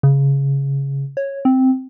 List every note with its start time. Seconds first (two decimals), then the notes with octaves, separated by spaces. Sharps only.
0.03 C#3
1.17 C#5
1.45 C4